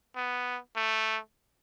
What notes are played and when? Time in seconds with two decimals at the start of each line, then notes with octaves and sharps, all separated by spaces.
0.16 B3
0.76 A3